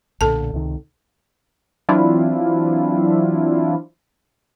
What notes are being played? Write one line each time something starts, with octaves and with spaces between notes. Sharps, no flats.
B1 A#2 D3 A4 A5
C#2 C3 D#3
E3 F#3 C4 D4 E4 F4